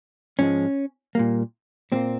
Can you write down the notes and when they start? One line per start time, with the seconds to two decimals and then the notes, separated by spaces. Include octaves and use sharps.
0.39 G#2 F3 G#3 C#4
1.15 A#2 G3 A#3
1.92 A#2 G3 A#3 C4